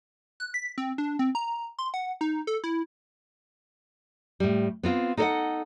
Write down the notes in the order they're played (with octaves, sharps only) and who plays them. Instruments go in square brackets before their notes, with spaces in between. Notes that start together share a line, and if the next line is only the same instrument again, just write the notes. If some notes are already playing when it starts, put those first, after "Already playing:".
[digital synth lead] F#6
B6
C4
D4
C4
A#5
C6
F#5
D#4
A4
E4
[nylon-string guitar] A2 G3
B3 C4 F4
D#4 A4 A#4 C#5 D#5 F#5